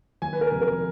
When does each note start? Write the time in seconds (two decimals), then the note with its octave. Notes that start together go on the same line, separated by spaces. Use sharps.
0.22 D#2 G#5
0.33 B4
0.41 A#4
0.52 F1
0.62 A#4